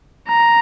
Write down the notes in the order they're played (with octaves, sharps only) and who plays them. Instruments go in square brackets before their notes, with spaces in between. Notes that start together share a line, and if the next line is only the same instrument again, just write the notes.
[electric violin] A#5